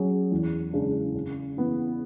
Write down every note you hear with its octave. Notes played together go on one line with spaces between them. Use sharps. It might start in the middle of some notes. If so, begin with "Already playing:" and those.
Already playing: F#3 C#4 G#4
E2
C#3 G#3 D4
C#3
E3 B3